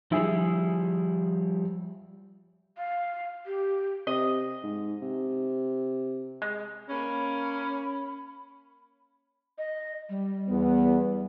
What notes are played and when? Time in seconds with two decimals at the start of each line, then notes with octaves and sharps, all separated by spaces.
0.12 F3 G3 E4 G#4
2.78 F5
3.46 G4
4.07 C3 D#5
4.63 G#2
5.02 C3
6.42 G#3
6.89 A#3 C#4 B5
9.58 D#5
10.10 G3
10.48 E2 B3